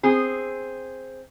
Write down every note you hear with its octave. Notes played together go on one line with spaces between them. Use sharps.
C4 G#4